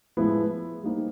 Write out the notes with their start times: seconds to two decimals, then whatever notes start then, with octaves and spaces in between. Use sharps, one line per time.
0.17 A2 F3 G#3 B3 E4
0.83 G3 A#3 D#4 G4 C5